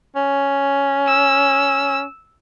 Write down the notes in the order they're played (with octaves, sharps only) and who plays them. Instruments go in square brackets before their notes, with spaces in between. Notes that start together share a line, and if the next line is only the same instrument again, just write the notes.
[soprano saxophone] C#4
[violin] E6